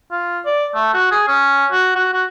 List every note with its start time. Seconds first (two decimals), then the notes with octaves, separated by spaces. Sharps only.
0.11 F4
0.46 D5
0.75 A3
0.94 F#4
1.11 G#4
1.28 C#4
1.72 F#4
1.95 F#4
2.14 F#4